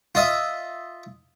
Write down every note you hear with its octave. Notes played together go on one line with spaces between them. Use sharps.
F4 D#5 E5